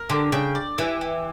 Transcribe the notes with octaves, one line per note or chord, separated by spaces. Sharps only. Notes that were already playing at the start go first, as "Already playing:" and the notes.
Already playing: A#4
D3 G4
C#3 G5
D5
E3 G4
G4